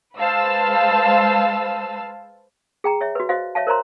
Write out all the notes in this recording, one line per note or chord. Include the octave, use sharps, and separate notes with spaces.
G#3 B4 C5 F5 A5 E6
G#4 G5 A#5
C#5 E5
F#4 B4
F#4 C5 D#5 F5
C#5 E5 F5 A5
A#4 C5 C#5 A#5 C6